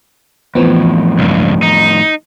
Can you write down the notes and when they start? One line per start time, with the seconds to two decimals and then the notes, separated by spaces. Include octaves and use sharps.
0.55 F2 A2 E3 F3 B3
1.19 C#2 G2
1.62 D#4